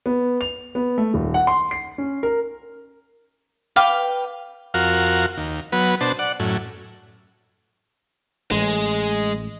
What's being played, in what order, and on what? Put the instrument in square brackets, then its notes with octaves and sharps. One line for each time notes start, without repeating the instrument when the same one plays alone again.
[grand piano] B3
F7
B3
A3
D#1
F#5
C6
C7
C#4
A#4
[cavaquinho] B4 F5 G5 D6
[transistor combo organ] F2 F#4 A#4 F5
D#2
F#3 B3 B4
B2 D4 C5 A5
D5 F#5
F#2 A2
[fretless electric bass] A1 [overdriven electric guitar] G#3